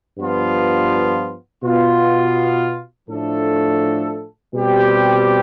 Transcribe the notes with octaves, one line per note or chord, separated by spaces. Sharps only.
G2 F3 B3 F4
B2 B3 F4
A2 F3 A3 D4 A4
B2 G3 C4 G4